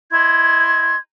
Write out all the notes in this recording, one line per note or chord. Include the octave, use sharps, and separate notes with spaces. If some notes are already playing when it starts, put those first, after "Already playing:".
E4 D#5 C6 G#6